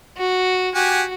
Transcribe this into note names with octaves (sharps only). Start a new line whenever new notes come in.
F#4
F#4 G4 F#5 G#5